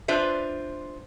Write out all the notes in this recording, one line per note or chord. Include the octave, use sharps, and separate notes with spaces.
D4 F4 B4 C5 E5